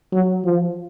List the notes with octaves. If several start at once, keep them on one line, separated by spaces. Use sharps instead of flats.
F#3
F3